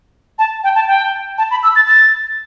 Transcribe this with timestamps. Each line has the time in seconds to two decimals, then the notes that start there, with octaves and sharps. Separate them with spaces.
0.39 A5
0.64 G5
0.75 A5
0.88 G5
1.38 A5
1.51 B5
1.63 E6
1.76 A6
1.87 A6